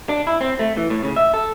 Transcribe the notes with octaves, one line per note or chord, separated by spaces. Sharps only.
D4
E4
C4
A3
E3
A2
C#3
E5
A4